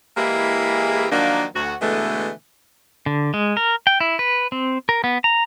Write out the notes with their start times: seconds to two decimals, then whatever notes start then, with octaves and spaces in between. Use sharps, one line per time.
0.17 E3 G#3 A#3 E4 G4 G#4
1.11 D#3 F3 F#3 A#3 D4
1.55 D2 F#4
1.81 B2 D3 E3 G#3 A3
3.06 D3
3.34 G#3
3.57 A#4
3.87 G5
4.01 E4
4.19 B4
4.52 C4
4.89 A#4
5.04 B3
5.24 A#5